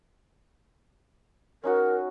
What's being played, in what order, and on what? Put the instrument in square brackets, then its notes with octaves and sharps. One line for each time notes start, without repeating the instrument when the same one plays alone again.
[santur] C#4 D#4 F#4 [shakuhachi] A#4